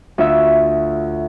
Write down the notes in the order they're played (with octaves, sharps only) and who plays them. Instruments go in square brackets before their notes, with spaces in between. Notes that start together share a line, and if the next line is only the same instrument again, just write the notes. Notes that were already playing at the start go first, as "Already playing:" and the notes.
[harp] D2 F4 C#5 E5